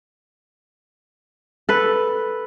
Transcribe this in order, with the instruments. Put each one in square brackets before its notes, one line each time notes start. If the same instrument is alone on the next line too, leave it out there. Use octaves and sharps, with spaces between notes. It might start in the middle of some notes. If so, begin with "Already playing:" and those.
[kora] A4 B4